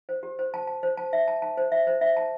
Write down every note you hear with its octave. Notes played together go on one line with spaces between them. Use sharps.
C5
G4
C5
A5
A5
C5
A5
E5
A5
A5
C5
E5
C5
E5
A5